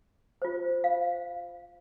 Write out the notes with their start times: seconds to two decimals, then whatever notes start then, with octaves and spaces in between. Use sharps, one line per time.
0.42 F4 C5
0.84 F5